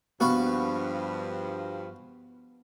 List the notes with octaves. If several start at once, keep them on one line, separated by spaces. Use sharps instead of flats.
G2 F3 B3 F#4 F5 C#6